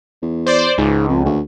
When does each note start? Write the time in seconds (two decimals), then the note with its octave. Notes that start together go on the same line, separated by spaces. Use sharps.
0.22 E2
0.46 C5 D5
0.78 C#2 G#2
1.09 F2
1.25 D2